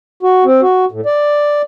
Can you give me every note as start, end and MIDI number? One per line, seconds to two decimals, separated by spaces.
0.23 0.44 66
0.45 0.61 60
0.62 0.85 66
0.92 1.01 45
1.06 1.62 74